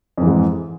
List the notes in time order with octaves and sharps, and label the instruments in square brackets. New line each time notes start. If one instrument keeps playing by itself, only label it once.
[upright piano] F2
E3
G#2